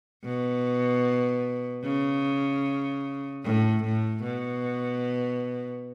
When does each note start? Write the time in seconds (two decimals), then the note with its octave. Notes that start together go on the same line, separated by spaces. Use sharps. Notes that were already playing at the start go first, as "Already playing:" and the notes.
0.24 B2
1.83 C#3
3.44 A2
3.83 A2
4.23 B2